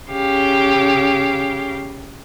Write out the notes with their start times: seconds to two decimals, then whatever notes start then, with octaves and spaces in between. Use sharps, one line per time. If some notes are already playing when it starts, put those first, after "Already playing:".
0.11 C#3 G4 F5